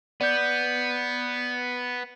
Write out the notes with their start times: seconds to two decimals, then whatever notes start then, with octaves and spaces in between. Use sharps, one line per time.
0.21 B3 D5 G6